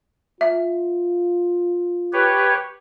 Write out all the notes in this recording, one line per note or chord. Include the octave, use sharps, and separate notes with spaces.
F4 E5
G4 B4 C#5